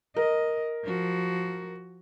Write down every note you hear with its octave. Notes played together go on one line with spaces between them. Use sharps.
A#4 D#5
F3 F#4